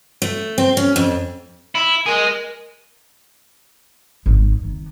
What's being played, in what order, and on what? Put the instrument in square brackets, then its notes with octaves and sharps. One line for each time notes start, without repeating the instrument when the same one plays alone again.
[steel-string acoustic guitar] A3
C4
C#4
F2
[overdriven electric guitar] E4
[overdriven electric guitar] G#3 G#4 [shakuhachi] A#4
[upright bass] G#1
D#3